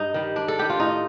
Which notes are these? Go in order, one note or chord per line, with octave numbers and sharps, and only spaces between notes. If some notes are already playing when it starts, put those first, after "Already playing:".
Already playing: G2 D#4
D#3 G3
G2 D4
A4
D#3 G3 G4
F4
A2 D#4